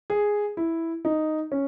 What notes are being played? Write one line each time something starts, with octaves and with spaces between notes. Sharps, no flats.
G#4
E4
D#4
C#4